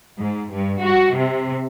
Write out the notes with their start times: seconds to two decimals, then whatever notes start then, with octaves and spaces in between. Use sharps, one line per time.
0.17 G#2
0.54 G2
0.82 F#4
1.16 C3